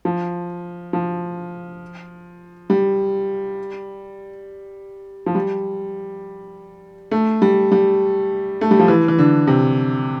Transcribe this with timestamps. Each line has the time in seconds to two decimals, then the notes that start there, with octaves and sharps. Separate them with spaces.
0.05 F3
0.93 F3
2.70 G3
5.26 F3
5.35 G3
7.11 A3
7.42 G3
7.72 G3
8.61 A3
8.71 G3
8.79 F3
8.88 E3
9.08 E3
9.18 D3
9.47 C3